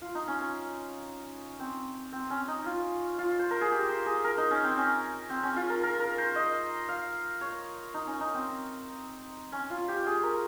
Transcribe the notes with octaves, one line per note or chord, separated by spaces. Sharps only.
F4
D#4
C#4
C#4
C4
C4
C#4
D#4
F4
F4
C5
A#4
G#4
G4
C5
G#4
A#4
D#4
C#4
C4
C#4
C4
C#4
F4
A#4
A#4
A#4
C5
D#5
F5
C#5
D#4
C#4
D#4
C4
C#4
F4
G4
G#4
A#4